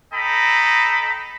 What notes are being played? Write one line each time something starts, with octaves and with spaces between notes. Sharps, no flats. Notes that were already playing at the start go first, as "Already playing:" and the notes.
A4 D#5 G5 A#5 B5